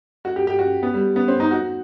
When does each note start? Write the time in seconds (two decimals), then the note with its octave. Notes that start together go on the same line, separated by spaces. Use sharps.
0.25 F#4
0.36 G4
0.47 G4
0.59 F#4
0.83 B3
0.94 G3
1.16 B3
1.28 C4
1.40 D#4
1.51 F#4